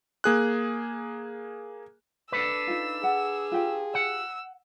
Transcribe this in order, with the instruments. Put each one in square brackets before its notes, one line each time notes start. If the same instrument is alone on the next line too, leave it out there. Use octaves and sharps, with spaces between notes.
[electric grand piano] A#3 G#4 F#6
[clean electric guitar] D4 A4 B4 [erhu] E6
[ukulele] D#4 F4
[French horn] G#4 [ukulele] F#5
[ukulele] F4 G4 G5
[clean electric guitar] F#5 [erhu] E6